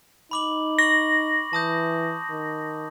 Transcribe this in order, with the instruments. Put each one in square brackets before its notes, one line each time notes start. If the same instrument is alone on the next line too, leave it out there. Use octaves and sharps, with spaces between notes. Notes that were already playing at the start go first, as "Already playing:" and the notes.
[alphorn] D#4 [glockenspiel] B5 D6 F#7
[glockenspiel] C#6 F#7 [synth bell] A#6
[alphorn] E3 [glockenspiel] A5 D#6 G6
[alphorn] D#3